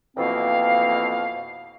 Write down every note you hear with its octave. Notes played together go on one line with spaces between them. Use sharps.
F2 B2 E3 A#3 C4 F5